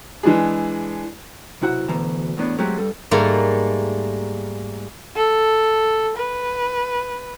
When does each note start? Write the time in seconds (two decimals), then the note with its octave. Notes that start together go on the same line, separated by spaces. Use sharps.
0.23 E3 G#3 D4 G#4
1.61 B1 C3 E4 F#4 F#5
1.88 D2 B2 E3 A5 A#5
2.37 E2 A2 B3 D4
2.58 F#3 G#3 A3 C4 F#4 G4
2.78 G2 G3 A4
3.11 G#2 G3 A3 A#3
5.16 A4
6.16 B4